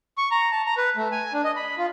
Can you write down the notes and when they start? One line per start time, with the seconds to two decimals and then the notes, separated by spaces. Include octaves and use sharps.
0.18 C#6
0.31 A#5
0.51 A5
0.66 A#5
0.77 B4
0.97 A3
1.12 G#5
1.33 D4
1.44 D#5
1.56 B5
1.78 F4